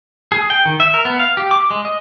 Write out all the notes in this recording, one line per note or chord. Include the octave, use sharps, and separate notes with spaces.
G#4
G5
D#3
E5
A#4
B3
F5
G4
D6
G#3
D#5